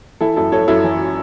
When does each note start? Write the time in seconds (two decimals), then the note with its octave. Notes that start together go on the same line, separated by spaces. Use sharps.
0.21 E3 E4 A4
0.36 F#2 E4 A4
0.52 F#2 A4 C#5
0.68 F#2 E4 A4
0.84 E3